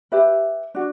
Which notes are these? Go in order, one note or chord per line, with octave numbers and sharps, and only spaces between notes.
G4 B4 E5
D4 F#4